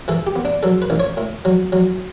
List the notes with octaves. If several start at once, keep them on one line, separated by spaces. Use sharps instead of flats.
E3 A4
G4
B3
D4
F#3 A4
B4
A1
C#5
A2
F#3
F#3